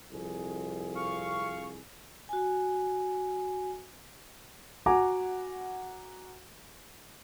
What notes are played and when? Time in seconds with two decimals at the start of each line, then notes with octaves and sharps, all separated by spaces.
0.12 C2 F2 G#4
0.95 F5 C#6
2.29 F#4 G#5
4.86 F#4 F#5 G#5 A#5 D6